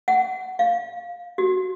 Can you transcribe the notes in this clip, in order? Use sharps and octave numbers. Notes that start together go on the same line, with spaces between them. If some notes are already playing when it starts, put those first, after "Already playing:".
F#5
F5
F#4